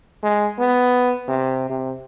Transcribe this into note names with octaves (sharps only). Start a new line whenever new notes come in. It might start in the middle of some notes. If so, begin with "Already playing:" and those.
G#3
B3
C3
C3